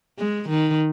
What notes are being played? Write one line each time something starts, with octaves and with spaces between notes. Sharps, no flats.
G#3
D#3